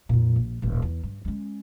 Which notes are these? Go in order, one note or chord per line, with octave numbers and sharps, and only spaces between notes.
F2 A#2
A#1
D#1 A1
E2
G2
G#3 C#4